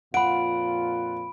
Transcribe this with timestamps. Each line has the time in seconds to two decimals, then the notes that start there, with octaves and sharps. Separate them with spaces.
0.14 F2 A#2 F4 F#5 B5 D7